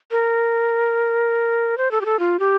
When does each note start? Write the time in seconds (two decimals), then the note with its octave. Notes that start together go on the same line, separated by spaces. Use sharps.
0.11 A#4
1.78 C5
1.91 A4
2.01 G4
2.05 A4
2.19 F4
2.39 G4